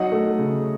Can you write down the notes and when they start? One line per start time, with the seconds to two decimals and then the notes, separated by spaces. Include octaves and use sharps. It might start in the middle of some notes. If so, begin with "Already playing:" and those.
Already playing: F#3 D#4 D#5 F#5
0.12 A3
0.39 C#3